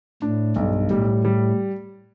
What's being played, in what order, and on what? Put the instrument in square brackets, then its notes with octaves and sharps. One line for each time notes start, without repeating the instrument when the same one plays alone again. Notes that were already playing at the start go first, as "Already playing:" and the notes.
[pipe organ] A2 [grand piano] D4
[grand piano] B1 [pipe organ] G2
[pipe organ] A2 [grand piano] G3
[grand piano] G3